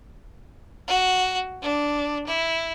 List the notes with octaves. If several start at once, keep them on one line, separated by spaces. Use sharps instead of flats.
F#4
D4
E4